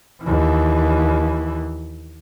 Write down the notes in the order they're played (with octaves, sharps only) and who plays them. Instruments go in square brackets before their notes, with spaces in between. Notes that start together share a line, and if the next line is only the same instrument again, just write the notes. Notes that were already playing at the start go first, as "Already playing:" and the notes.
[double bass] D#2 E3